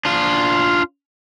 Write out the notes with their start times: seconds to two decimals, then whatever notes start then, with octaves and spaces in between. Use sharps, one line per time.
0.05 D4 F4